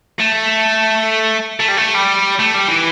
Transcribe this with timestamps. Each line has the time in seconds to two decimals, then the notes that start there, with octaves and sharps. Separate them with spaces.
0.20 A3
1.60 A3
1.68 G3
1.77 A3
1.95 G3
2.39 A3
2.54 G3
2.68 E3